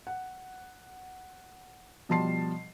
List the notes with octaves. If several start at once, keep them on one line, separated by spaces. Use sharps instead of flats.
F#5
B2 F3 G3 A5 C6 C7